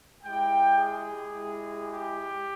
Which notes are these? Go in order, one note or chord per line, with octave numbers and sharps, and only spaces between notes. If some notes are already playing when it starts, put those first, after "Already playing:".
G#3 E4 G4 G5
G#4
G#3 E4 G4
G4